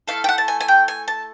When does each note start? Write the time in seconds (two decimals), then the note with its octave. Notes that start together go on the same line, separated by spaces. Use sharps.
0.08 A3 C4 E4 A4 F5
0.24 G5
0.29 F#5
0.38 A5
0.48 G#5
0.61 G#5
0.68 G5
0.88 G#5
1.08 A5